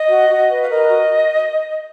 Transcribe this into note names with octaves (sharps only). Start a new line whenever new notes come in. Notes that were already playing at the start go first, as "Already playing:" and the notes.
Already playing: D#5
F#4
F#4
B4
F5
A#4 D#5
F#4